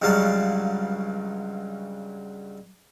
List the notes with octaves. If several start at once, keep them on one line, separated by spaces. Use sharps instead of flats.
C#2 G2 C#3 F#3 F5 A5